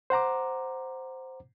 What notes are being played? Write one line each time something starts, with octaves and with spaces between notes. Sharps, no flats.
C5 F#5 A#5 D6